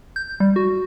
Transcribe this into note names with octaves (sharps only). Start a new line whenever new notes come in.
G6
G3
F#4